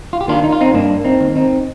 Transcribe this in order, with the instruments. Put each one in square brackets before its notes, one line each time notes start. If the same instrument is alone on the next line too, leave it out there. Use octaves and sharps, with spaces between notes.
[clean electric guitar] F4
G4
D#3 A#3 D4 F4
D#4
F4
C4 D#4
G2 A#3 D4
C4 D#4
D#3 A#3
C4 D#4